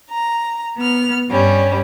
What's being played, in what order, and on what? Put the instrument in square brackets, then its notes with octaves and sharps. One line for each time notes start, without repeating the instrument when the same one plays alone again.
[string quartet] A#5
B3 F6
G2 G3 C#4